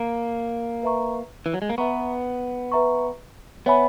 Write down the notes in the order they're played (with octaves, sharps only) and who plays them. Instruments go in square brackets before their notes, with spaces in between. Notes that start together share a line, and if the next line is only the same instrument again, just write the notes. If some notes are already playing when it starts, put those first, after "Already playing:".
Already playing: [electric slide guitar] A#3
[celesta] B4 E5 A#5 C#6
[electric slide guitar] E3
F#3
G#3
A#3
[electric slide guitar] B3 [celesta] B4 E5 A#5 C#6
[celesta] B4 E5 A#5 C#6
[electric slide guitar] B3 [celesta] C#5 E5 G#5 B5